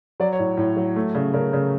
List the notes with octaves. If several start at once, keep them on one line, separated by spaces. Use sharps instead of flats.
F#3 D5
C#5
A2
A2
F#3
A3
C#3
C#3 A#4
C#3